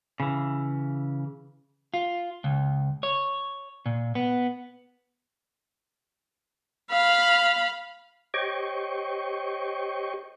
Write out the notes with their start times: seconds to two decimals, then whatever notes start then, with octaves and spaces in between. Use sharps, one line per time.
0.20 C#3 E3
1.94 F4
2.44 C#2
3.03 C#5
3.86 A#2
4.15 B3
6.91 F5 B5
8.34 G4 C5 C#5 D#5 G5 C#6